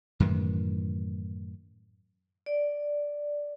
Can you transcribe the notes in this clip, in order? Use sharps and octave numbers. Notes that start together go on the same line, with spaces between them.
F#2 A2 D#3 E3
D5